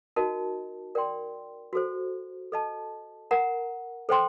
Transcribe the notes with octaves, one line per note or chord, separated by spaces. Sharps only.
D#4 F#4 A#4 D#5 A5
A#4 D5 G5 C6
F#4 A4 C5
A4 D#5 A5
A#4 F#5 A#5
A4 C5 G5 C6